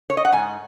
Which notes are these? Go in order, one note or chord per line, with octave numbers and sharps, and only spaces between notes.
C#5
D#5
F#5
G#2 G#5